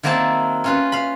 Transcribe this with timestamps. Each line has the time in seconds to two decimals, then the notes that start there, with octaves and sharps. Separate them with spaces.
0.03 D#3 F#3 A#3 C4 E4 A5
0.64 C#4 F4 B4
0.92 F5 B5